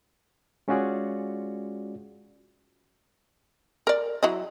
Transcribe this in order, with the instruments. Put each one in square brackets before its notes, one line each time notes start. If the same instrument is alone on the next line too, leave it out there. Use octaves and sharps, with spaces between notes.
[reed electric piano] G#3 C#4 F4 F#4 G#4 D5
[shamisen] A#4 D5
F#3 E4 D#5